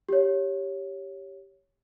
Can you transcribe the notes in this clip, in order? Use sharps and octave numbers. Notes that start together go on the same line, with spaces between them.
G4 C#5